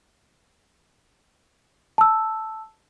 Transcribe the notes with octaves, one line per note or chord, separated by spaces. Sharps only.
A5 E6